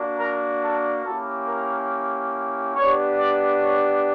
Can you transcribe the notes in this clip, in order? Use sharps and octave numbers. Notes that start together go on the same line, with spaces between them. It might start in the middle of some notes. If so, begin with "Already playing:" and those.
Already playing: A#3 D4 F#4
A#4
A4
A#3 C#4 E4 G4 A4
A#4
B3 D4 G4 C#5
D5
C#5